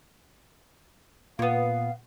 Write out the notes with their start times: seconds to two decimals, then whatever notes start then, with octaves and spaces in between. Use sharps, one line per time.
1.39 A#2 A#3 B3 F5